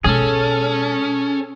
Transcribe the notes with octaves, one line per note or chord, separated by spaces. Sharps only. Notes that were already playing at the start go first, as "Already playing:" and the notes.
B2 G#3 C#4 G#4 A4